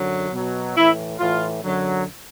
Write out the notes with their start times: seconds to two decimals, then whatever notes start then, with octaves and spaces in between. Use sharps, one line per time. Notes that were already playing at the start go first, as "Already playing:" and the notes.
Already playing: F#2 D3 F#3
0.32 B2 F#3
0.76 A2 E3 E4
1.18 A2 E3 F4
1.62 F#2 D3 F#3